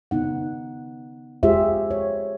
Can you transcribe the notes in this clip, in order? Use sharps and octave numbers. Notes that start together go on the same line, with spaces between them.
C#3 B3 D#4 F#5
G#3 F4 G4 G#4 C5 E5
C#5